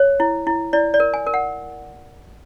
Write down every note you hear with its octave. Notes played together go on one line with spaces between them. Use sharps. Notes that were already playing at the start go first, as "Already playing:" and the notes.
Already playing: C#5
E4
E4
E4 D5
D5
A#4
G#5
A#4
F#5